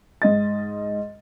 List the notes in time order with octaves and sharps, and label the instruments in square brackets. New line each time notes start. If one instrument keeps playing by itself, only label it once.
[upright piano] G#2 D#5 A6